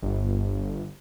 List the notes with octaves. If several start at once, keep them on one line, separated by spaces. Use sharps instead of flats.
G1